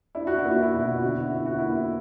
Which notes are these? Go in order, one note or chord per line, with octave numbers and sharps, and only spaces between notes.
D4 E4
F#4
E4
A#3
F#4
E4
B2 F#4
E4
D3 F#4
E4
F#4
D3 E4
F#4
A#3 E4